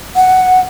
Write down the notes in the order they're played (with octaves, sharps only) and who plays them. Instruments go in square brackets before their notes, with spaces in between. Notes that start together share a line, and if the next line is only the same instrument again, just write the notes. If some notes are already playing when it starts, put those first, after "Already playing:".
[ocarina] F#5